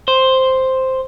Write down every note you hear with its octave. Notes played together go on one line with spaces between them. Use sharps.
C5